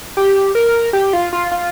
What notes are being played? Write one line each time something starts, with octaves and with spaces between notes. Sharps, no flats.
G4
A#4
G4
F4
F4
F4